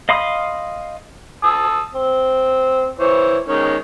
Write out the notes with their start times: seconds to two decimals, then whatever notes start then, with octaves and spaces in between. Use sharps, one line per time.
0.09 D#5 F5 B5 C6 D#6
1.43 A5 D#6 E6
1.94 C4
2.99 E3 C5 C#5
3.48 D#3 G#3 C#4